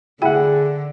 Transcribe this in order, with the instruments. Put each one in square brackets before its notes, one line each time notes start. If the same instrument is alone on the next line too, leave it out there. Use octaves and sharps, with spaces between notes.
[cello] D3 [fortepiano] E4 F#5 [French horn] G#4 [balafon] G5